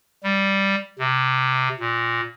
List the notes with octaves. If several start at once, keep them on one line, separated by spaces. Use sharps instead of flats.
G3
C3
A#2